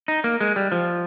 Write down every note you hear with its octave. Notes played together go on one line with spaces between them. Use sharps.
D#4
A#3
G#3
G3
F3